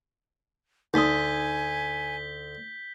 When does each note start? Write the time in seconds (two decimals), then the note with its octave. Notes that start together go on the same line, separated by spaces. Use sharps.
0.94 D2 D#4 G#5 C6 D#6 G6 B6 G7